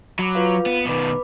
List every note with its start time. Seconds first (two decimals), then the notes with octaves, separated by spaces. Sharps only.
0.19 F#3 B5 D6
0.35 F4 B4 F5
0.66 B3
0.87 B2 D#3 B4 B5 D6